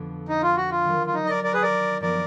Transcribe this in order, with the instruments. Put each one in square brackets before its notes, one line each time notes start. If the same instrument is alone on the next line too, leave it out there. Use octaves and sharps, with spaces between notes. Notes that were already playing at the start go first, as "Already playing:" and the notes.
Already playing: [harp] F2 D3 F3 B3 D4
[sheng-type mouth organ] D#4
F4
F#4
F4
[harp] D#3 F#3 D4
[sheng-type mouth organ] F4
D#4
D#5
A#4 D5
A#4 D5
G#4 B4
A#4 D5
[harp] F#2 F3 B3 [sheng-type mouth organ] A#4 D5